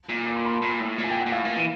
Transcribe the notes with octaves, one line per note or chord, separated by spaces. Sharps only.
A#2
D6
C6
B5
A5
A#2
A2
A#2
G#5
G5
A#2 F#5
A2 F5
A#2
E3